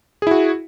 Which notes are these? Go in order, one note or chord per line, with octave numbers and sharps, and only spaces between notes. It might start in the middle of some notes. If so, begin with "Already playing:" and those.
E4 F#4 G#4